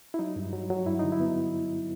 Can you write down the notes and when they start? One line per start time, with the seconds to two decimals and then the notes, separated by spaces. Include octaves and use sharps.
0.14 E4
0.19 F#3 D#4
0.36 G2
0.53 F#3
0.70 F#3
0.86 G2 E4
0.99 D3 D#4
1.12 E4
1.20 B3